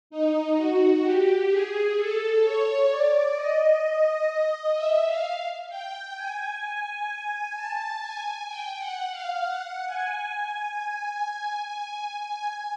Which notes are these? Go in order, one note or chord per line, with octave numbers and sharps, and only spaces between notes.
D#4
F#4
G4
G#4
A4
C#5
D5
D#5
E5
F5
G5
G#5
A5
G#5
G5
F#5
F5
F#5
G#5
G#5